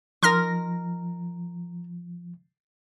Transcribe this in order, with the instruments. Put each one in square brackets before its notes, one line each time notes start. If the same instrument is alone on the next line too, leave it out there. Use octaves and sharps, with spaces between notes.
[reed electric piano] F3 [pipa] D#4 A#4 [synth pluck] C6 F6 A#6